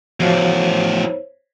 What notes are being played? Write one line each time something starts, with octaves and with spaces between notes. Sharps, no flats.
E2 A2 F3 F#4 C5 C#5 F5